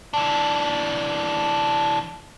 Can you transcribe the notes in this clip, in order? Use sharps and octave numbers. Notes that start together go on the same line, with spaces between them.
E3 D4